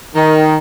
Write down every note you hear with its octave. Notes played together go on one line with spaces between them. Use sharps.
D#3